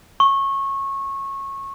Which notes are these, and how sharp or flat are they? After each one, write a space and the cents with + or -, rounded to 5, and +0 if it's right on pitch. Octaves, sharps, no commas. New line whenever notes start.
C#6 -20